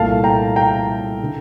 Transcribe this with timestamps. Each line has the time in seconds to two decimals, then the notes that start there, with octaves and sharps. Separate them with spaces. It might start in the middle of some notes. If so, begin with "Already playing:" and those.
Already playing: C2 A#2 A3 F5 A5
0.24 G5 A#5
0.56 G5 A#5
1.23 D3